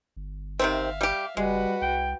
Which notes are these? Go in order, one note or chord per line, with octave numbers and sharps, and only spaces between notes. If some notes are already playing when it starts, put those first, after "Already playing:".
G1
C3 D#3 C4 E5 F5
G3 G4
F#1 G3 G#3 F#4 B4
C2 G5